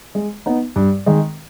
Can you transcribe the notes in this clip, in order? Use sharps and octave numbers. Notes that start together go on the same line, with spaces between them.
G#3
B3 D#4
G2
D#3 G#3